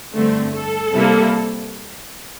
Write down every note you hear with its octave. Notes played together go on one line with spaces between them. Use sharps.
G2 D3 A3 C4
A4
C3 G3 A#3 E4